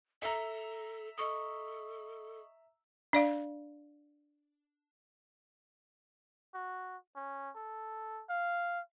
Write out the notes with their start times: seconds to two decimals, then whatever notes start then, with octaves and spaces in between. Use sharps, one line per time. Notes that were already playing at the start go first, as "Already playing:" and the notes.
0.22 A4 E5 A#5
1.18 A4 D#5 C#6 D#6
3.13 D4 D5 F5
6.54 F#4
7.16 C#4
7.56 A4
8.30 F5